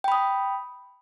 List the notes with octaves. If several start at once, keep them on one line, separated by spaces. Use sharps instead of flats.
G5 B5 D#6